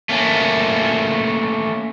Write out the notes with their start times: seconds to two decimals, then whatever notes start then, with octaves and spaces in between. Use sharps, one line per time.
0.09 A3 A#3 C#4